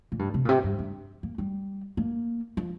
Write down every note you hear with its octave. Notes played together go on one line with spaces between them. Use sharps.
A#2
G2
C3
A#2
C3
G2
G2
A#3
G3
A#3
F3